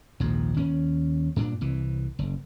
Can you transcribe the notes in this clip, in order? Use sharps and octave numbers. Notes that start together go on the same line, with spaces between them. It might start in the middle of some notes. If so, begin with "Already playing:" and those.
A#1 D#2 G#2 F3
D#2 C#4
G2 A#2 B3 D4
C2 E3
F#1